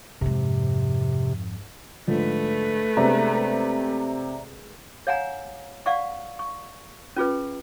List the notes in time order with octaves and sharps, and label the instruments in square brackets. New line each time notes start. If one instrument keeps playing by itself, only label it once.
[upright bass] F2 G#2 [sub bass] C3
[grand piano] G#2 D3 F3 [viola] A3 B4
[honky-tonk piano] C3 [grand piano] G#3 B3 D4 [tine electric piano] D5 E5 A#5
[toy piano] C#5 F5 F#5 G#5 A#5
D5 F5 F#5 C#6
C#6
C#4 F4 G#4 B4